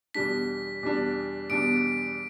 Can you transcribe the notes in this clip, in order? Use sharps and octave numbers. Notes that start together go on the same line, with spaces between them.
E2 B2 G3 D4 B6
E2 B2 G3 D4
E2 B2 G3 D4 D7